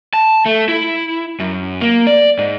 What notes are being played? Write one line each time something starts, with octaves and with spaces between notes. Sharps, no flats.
A5
A3
E4
F#2
A#3
D5
G#2